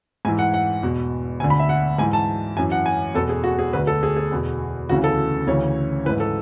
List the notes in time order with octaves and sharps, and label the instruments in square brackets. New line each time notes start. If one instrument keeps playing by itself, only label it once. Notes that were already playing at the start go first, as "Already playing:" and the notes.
[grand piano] G#2 G#5
E3
F#5
F#5
E2 B2
D2 D3 G#5
B5
E5
F#5
G#2 G#5
E3
A5
F#2 E3 G#5
F#5
G#5
E2 B2 A4
G#4
F#4
G#4
D2 D3 B4
A4
G#4
G#4
E2 B2
D2 C#3 E3 F#4
A4
D2 C#3 E3 C#5
E3 B4
G#2
A4